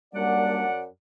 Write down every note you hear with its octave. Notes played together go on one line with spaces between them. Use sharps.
F#2 G3 A#3 D4 D5 F#5